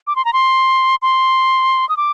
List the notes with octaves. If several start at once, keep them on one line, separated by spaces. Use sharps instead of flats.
D6
C6
A#5
C6
C6
D#6
D6